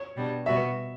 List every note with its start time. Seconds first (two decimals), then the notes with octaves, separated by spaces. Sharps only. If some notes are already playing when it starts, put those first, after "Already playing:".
Already playing: C#5
0.16 B2 G3 D4
0.46 B2 G3 B3 F#4 E5